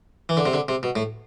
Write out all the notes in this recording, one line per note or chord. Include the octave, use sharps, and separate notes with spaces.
E3
D3
C3
D3
C3
B2
A2